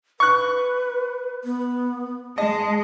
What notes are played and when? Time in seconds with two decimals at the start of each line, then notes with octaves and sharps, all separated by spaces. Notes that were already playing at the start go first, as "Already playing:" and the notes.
0.20 B4 C#6 F#6
1.44 B3
2.38 G#3 D#5 A5